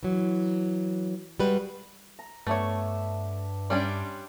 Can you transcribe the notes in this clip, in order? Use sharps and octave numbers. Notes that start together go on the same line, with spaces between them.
E3 F#3
G3 G#3 F#4 B4
A#5
G2 A3 B3 D4 C#5 E5
G3 C#4 D4 G5 C6